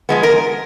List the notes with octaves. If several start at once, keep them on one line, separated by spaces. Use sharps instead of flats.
F3 G#3 B3
A#4